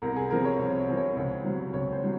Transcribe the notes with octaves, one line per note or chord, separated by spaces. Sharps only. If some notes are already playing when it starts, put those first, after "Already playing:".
C2 A#4
G#4
C3 F3 A#4
C#5
C2
C#5
C3 F3
C#5
C#2 C#5
C3 F#3 C5
C#2 C#5
C5
C3 F#3